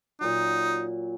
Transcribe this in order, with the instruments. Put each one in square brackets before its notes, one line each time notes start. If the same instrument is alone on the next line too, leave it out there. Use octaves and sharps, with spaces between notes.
[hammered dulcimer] A#2 F#3 [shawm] D#4